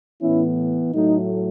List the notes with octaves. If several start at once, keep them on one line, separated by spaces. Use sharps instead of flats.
A2 E3 B3 C#4 E4
A2 F#3 A3 D#4